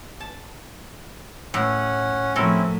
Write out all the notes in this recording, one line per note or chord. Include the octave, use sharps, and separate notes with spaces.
A5
A2 C#4 F#5
A2 F3 C4 C#4 E4 F#4 A4 A#4